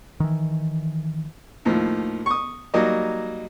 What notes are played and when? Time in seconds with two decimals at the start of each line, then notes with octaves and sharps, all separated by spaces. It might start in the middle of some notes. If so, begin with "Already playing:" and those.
0.20 D#3 E3
1.65 D#2 A2 F3
2.26 C#6 D#6
2.74 F#3 G3 A#3 D#4 D#5